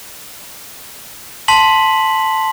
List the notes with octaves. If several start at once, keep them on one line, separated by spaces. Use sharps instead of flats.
A5 C6 B6 F#7